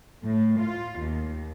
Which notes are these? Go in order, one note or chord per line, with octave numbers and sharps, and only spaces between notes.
A2
F4
D#2